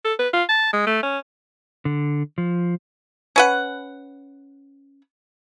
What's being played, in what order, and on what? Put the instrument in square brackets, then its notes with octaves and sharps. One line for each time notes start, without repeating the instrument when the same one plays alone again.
[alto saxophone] A4
B4
F4
A5
G#3
A3
C#4
[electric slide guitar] D3
F3
[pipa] C#4 B4 F#5